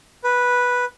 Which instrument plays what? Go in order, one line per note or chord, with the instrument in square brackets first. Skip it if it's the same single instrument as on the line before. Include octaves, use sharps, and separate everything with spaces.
[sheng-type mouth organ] B4